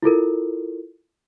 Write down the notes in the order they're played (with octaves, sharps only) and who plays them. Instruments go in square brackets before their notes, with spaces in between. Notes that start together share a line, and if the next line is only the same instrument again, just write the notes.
[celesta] E4 F4 A4 A#4